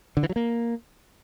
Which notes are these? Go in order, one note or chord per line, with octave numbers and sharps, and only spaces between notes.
D3
E3
F#3
A#3